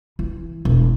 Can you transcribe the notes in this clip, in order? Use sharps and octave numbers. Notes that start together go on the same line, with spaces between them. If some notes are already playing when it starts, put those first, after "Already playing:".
E3
E1